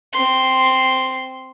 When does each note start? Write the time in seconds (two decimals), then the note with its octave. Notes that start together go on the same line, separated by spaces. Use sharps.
0.12 C4 C6